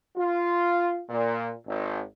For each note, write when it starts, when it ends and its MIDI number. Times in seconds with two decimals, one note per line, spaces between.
0.17 0.99 65
1.09 1.50 46
1.67 1.99 32